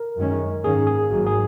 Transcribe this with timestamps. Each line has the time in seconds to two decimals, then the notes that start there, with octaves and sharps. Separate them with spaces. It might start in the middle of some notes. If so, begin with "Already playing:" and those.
Already playing: A#4
0.17 F#2 D#3 G#3 C#4
0.64 G#2 D#3 A#3 C#4 G#4
0.87 G#4
1.11 G#1 G#2 D#3 F#3 A#3 F#4
1.27 G#4